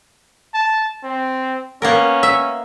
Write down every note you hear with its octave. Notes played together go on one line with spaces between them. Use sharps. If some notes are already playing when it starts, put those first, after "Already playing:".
A5
C4
A#3 B3 C#4 A#4
E5